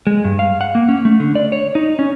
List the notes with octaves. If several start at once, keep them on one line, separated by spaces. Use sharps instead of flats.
G#3
G2
F5
F#5
A#3
C#4
A3
D3
D5
C#5
D#4
C#4